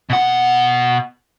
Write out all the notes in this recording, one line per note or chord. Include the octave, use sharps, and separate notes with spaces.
B2 F#5